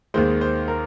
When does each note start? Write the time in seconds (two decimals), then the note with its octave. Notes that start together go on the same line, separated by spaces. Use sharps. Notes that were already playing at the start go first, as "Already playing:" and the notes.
0.14 D#2 D#3 G#3 C5
0.41 C5
0.68 A#4